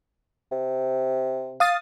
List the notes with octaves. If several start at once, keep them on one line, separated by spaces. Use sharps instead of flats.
C3
F5 D#6 A6